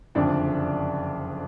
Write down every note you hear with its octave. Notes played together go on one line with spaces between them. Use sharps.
F#1 F2 D3 D4 D5